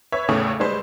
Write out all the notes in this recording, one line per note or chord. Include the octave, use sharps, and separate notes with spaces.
B4 C#5 E5
E2 A2 C#3 A3
G3 G#3 B4 C5